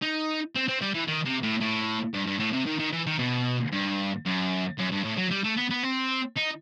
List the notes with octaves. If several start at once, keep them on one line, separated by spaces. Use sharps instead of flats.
D#4
C4
C4
G3
E3
D#3
C3
A2
A2
G2
G2
A2
C3
D#3
D#3
E3
D#3
B2
G2
F#2
F#2
G2
A2
F#3
G3
A3
B3
B3
C4
D#4